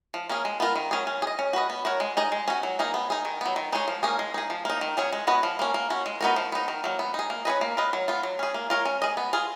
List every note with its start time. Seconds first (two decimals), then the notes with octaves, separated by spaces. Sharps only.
0.14 F3
0.29 A#3 C#4 G#4
0.45 G#3
0.60 B3 F4 A#4
0.75 D#3
0.91 F#3 C#4 G#4
1.07 C#4
1.22 G#4
1.27 D#5
1.39 C#4
1.53 F#4 B4 D#5
1.70 B3
1.85 F#4 A#4 C#5
2.00 G#3
2.17 D#4 G#4 D#5
2.32 G#3
2.48 C#4 F#4
2.63 F#3
2.79 A#3 D#4 G#4
2.94 B3
3.10 D#4 G#4
3.25 D#3
3.41 F#3 B3
3.56 D#3
3.72 G#3 D#4 G#4 C#5
3.88 F3
4.03 A#3 C#4 G#4
4.19 G#3
4.34 D#4 G#4
4.50 F3
4.65 A#3 D#4
4.81 D#3
4.97 F#3 C#4 G#4 C#5
5.12 G#3
5.27 B3 F#4 B4 D#5
5.43 F3
5.59 A#3 C#4
5.74 A#3
5.90 C#4 F#4
6.06 G#3
6.21 B3 D#4 F#4 A#4
6.36 F3
6.52 B3 D#4
6.68 D#3
6.84 F#3 A#3
6.99 B3
7.14 D#4 G#4
7.30 A#3
7.45 C#4 G#4 B4 D#5
7.61 A#3
7.77 F4 B4 D#5
7.93 F#3
8.08 B3 F4
8.23 F#3
8.39 C#4 G#4
8.54 A#3
8.70 F4 A#4 C#5
8.85 C#4
9.02 G#4 D#5
9.17 B3
9.33 F4 G#4